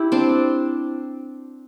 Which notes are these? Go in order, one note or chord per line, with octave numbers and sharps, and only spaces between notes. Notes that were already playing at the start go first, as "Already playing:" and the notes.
Already playing: E4 G4
C4 D4